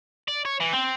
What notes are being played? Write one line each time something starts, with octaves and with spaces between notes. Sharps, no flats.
D5
C#5
E3
C4